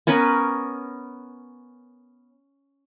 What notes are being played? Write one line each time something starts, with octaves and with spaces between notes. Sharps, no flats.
B3 C#4 A#4 B4